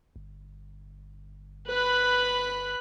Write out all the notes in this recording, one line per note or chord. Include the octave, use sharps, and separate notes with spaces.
G1
B4 B5 F#6